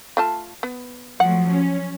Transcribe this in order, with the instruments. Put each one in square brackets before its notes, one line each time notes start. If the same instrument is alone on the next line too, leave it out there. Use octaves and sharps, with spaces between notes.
[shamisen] A3 F4 A5
B3
[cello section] F3 F#3 A3 [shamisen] F#5
[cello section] C#4